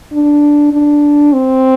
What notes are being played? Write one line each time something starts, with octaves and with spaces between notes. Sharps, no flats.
D4
D4
C4